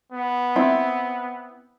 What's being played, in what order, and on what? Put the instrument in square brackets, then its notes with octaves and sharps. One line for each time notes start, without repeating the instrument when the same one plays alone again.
[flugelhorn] B3
[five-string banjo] C4 E4